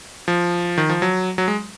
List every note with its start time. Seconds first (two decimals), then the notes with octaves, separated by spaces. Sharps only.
0.28 F3
0.78 D#3
0.89 F3
1.02 F#3
1.38 F#3
1.48 G#3